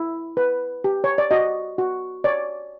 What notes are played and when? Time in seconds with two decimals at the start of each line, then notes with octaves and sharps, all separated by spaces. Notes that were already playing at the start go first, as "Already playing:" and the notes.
Already playing: E4
0.37 B4
0.84 G4
1.04 C#5
1.18 D5
1.31 F#4 D#5
1.78 F#4
2.24 C#5 D5